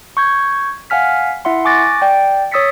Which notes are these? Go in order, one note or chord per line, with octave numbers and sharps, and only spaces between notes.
C#6 G6 G#6
F5 F#5 G#5 F6 B6
E4 E5 F#5 C6
G#5 C#6 D6 F#6 A6 A#6
D5 G5
C#5 D#6 E6 A6 B6 C#7